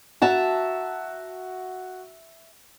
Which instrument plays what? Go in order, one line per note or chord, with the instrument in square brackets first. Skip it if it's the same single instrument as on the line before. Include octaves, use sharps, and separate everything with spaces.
[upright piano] F#4 [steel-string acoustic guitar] E5 A5 A#5